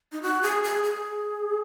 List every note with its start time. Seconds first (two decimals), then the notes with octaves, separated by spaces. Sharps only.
0.12 D#4
0.22 F#4
0.43 G#4
0.64 G#4
0.84 G#4